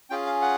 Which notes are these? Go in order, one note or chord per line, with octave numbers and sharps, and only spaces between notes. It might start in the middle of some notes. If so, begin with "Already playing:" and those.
C#4 F4 G#4 G5
F5
F#5